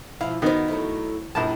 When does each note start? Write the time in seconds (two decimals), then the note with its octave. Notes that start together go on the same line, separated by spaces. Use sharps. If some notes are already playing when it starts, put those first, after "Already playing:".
0.21 B2 F3 E4 F5
0.42 D#3 B3 D#4 F#4 C5
0.68 F#3 A3 E4
1.35 A#1 G3 E4 A#4 A5